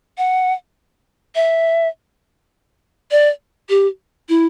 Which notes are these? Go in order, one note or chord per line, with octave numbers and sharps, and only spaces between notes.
F#5
E5
D5
G4
E4